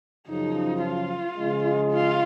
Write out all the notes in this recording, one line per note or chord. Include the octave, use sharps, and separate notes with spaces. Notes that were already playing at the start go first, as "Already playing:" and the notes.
F#2 C#3 F3 D#4
F4
C#3 F3 G#3
F4